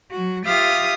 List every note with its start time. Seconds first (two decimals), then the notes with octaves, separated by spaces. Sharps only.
0.11 F#3 F#4
0.46 F4 G4 E5 F5 D#6 F6